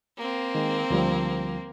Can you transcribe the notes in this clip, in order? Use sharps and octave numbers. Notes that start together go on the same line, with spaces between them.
A#3 C4
D#3 G#3
D2 F3 G3